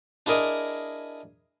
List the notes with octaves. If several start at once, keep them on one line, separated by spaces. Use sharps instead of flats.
D4 E4 G#4 A#4 D#5